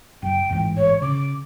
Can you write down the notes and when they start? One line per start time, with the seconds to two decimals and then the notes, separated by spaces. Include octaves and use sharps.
0.22 F#1 G5
0.49 A1 E2 G#2
0.77 C#5
1.02 C#3 D6